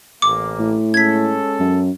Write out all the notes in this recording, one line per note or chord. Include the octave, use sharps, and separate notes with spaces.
A1 A#3 D6
A2
G#3 C#4 A4 G#6 B6
F#2